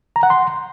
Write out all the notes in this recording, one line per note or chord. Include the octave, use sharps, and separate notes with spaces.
A#5
F#5
C6